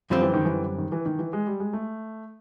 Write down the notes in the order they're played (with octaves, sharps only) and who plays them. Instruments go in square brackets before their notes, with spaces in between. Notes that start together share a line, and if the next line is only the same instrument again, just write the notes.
[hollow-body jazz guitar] F#2 D3 G3 C4 [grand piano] F3
[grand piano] E3
D#3
E3
D#3
E3
D#3
E3
G#3
G3
G#3
A3